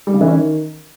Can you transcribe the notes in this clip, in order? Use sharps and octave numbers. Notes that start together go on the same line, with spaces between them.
G3
C#3
E3
C#4
D#3